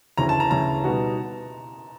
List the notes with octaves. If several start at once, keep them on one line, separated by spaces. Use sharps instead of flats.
D2 C#3 E3 A3 C#4 A#5
A5
A#5
D2 C#3 E3 A3 C#4 A#5
B2 G3 B3 D#4 F#4